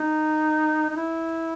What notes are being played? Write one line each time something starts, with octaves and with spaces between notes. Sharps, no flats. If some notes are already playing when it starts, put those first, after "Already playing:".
Already playing: D#4
D#4
E4